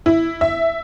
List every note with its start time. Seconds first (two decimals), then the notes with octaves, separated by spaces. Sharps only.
0.06 E4
0.41 E5